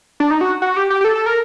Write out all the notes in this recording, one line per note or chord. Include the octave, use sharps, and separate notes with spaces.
D4
D#4
F#4
F#4
G4
G4
G4
A4
A4
A#4